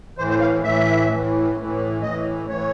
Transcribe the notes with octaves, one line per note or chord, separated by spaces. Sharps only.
A2 E3 C5
C5
F5
A2 E3 E5
A2 E3
A2 E3
A2 E3 D#5
A2 E3 C#5